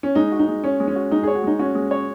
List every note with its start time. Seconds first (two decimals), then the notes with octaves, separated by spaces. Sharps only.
0.03 C#4
0.15 G#3 D#4
0.32 F#4
0.39 D#4
0.48 G#3
0.64 C#4 C#5
0.80 G#3
0.88 C#4
0.96 F#4
1.11 G#3 D#4
1.23 G#4 C#5
1.35 F#4
1.43 G#3 D#4
1.59 C#4 F#4
1.75 G#3
1.91 C#5